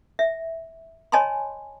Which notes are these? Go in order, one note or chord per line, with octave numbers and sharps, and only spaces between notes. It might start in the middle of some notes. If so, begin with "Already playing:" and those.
E5
C#5 D#5 G#5 A5 B5 C6